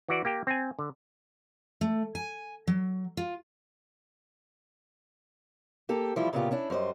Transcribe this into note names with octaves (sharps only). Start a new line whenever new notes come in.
E3 F#4 D5
A#3 G4 G5
C4 G#5
D3
A3
G#5
F#3
F4
A#3 G4 A4
E3 F3 G3 A3 E4 F4
A#2 C#3 B3 E4 F4 G4
C#4 D4 E4
F#2 G3 C5 D#5